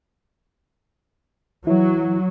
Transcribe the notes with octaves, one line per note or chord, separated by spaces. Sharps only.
E3 F#3